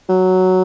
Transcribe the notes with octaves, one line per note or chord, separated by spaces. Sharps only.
F#3